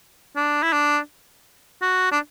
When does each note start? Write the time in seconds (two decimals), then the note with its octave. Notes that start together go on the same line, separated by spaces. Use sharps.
0.36 D4
0.63 E4
0.72 D4
1.82 F#4
2.12 D4